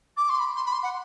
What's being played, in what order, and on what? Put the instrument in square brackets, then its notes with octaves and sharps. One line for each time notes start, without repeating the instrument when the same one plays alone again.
[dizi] D6
C6
B5
C6
B5
C6
F#5